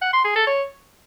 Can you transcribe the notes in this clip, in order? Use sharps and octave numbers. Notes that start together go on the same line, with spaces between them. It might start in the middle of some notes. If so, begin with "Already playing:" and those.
F#5
C6
G#4
A4
C#5